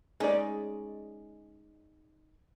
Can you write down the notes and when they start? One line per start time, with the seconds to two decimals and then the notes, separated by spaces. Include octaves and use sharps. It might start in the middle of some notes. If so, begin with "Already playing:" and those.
0.20 G#3 C#4 D#4 D5